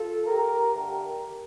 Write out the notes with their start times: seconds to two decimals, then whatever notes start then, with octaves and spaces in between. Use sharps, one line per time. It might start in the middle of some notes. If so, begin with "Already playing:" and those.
Already playing: F4 A4
0.26 G4 A#4
0.74 G2 D3 A3 G4 A#4